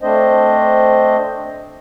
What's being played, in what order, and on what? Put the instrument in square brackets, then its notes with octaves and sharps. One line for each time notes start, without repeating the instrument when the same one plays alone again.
[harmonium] A3 C4 D4 C5 D#5